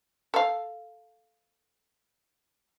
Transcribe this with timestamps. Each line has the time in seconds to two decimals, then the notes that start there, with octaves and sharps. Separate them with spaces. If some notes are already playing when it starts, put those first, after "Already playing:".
0.34 A4 F5